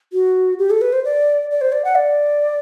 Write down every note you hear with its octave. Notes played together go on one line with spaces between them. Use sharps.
F#4
G4
A4
B4
C5
D5
D5
C5
D5
F#5
D5